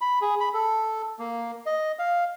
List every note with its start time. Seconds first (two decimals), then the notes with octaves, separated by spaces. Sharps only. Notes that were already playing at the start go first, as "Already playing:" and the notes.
0.01 B5
0.22 G#4
0.40 B5
0.54 A4
1.19 A#3
1.66 D#5
1.99 F5